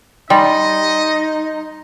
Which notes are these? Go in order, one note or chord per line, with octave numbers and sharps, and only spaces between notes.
G3 D#4 D#5 C6 A6